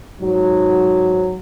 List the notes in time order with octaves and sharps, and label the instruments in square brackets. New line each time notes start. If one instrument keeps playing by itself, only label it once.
[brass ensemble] G#2 F#3